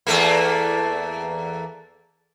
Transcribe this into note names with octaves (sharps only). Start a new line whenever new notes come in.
E2 A3 A#3